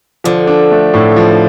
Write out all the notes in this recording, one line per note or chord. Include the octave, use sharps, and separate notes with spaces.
D3 F3
D4
A3
A2
F3